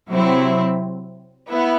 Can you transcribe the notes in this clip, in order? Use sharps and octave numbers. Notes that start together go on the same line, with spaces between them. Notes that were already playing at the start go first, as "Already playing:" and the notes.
C3 F#3 C4 E4
B3 E4